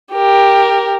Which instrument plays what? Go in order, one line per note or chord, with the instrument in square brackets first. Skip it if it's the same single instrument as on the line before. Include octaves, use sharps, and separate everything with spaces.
[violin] G4 A#4